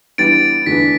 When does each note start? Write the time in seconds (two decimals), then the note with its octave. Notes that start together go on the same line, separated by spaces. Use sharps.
0.18 E3 G3 B3 D4 G4 A6 D7
0.66 E2 D3 A3 D4 B4 B6